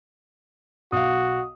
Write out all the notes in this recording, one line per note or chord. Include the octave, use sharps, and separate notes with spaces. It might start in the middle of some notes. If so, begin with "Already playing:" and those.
B1 F#4 F5 D#6